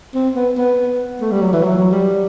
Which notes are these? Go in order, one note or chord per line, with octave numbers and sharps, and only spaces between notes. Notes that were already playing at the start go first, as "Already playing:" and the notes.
C4
B3
B3
A3
G3
F#3
E3
F#3
F#3
G3